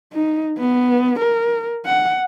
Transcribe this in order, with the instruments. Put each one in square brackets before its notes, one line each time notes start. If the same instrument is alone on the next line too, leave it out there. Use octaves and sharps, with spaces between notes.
[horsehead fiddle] D#4
B3
A#4
F#5